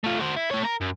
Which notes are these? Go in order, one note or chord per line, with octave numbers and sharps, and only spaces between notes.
A3 F4
F#4 C5
E4
A3 C#5
A#4
F#2